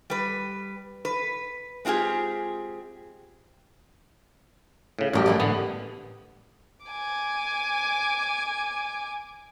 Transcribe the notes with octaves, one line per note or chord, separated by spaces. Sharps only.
G3 B4
B4
G#3 C4 F4 G4 G#4
A2 C#3
A1 F#2 G3 G4
E3 A3 A#3
A2 D3 B3
G#5 D6